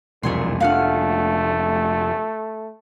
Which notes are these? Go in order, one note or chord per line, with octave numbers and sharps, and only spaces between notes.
E1 C2 F2 A#2 A3 G#5 C6
F1 F3 A3 D4 F5 F#5 F6